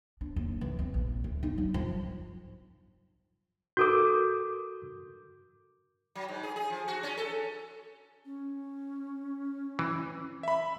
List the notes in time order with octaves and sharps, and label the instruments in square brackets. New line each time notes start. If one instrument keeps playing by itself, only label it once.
[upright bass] D4
D#2
E3
C4
A#1
D2
D#4
F#3
F3
[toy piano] F#4 A4 A#4 [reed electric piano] D6 G6
[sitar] F#3
G#2
G#4
G#4
F3
F#4
C#4
A4
[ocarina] C#4
[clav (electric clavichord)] E3
[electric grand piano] E5 B5